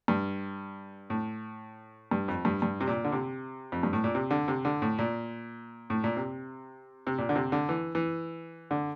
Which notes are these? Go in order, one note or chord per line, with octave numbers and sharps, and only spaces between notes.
G2
A2
G2
F2
G2
G2
C3
A#2
D3
C3
F2
G2
A2
A#2
C3
D3
C3
D3
A2
A#2
A2
A#2
C3
C3
A#2
D3
C3
D3
E3
E3
D3